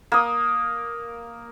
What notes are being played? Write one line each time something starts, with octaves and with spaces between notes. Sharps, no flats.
A#3 D#6